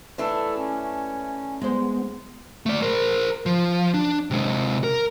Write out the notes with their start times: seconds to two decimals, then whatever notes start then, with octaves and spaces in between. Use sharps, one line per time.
0.18 E3 A3 D4 A4
0.56 C#4
1.61 G#3 B3 C5
2.66 A3 D5
2.82 A#4 C5
3.46 F3
3.94 D4
4.31 C3 G#3
4.84 A#4